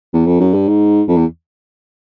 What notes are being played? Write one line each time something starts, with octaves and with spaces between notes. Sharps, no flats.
E2
F2
F#2
G2
G#2
F2
E2